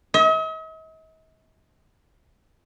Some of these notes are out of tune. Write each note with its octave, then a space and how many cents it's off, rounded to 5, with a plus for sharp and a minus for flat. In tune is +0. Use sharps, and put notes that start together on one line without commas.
D#5 +45